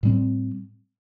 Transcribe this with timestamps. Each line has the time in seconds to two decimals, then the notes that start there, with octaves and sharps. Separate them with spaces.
0.03 A2 G3 C4